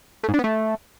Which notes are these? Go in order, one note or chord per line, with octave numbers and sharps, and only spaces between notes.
A3
G#2
D4
B3
A3